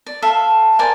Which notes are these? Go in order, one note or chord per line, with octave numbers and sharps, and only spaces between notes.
D5
A4 E5 F5
A#4 C5 D5 G#5